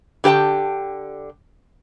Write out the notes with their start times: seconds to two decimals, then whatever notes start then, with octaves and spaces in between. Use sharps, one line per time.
0.24 D3 G4 A#4 G5 A5